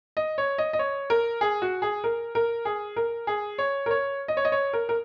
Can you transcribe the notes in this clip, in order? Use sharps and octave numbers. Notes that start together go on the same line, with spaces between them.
D#5
C#5
D#5
D#5
C#5
A#4
G#4
F#4
G#4
A#4
A#4
G#4
A#4
G#4
C#5
A#4
C#5
D#5
C#5
D#5
C#5
A#4
A#4